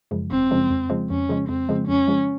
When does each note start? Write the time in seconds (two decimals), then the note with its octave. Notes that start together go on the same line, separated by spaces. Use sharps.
0.11 F#2 C#3 F3 G#3
0.31 G#1 C4
0.51 F#2 C#3 F3 G#3
0.71 F2
0.90 C#3 F3 G#3
1.10 F2 C#4
1.29 C#3 F3 G#3
1.48 F2 C4
1.69 C#3 F3 G#3
1.88 F2 C#4
2.08 C#3 F3 G#3